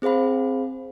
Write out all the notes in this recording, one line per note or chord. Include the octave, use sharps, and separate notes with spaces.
C4 G#4 C5 F5 B5